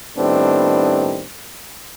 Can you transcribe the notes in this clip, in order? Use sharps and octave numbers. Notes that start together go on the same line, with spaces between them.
A2 D#3 G3 B3 C4 D4